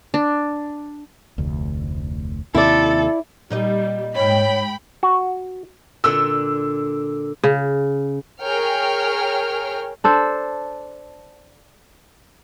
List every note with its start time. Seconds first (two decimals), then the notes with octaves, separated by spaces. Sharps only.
0.14 D4
1.38 F1 D2
2.55 D#2 C3 E4 A4 D5
3.50 A#2 G3 D#4 D#5
4.16 G#2 C#5 G5 B5
5.03 F#4
6.04 A#2 D3 E6
7.44 C#3
8.41 G#4 A#4 C#5 G5 F6
10.04 D4 A4 C5